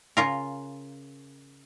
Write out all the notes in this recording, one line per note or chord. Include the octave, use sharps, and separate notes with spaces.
C#3 F4 A#4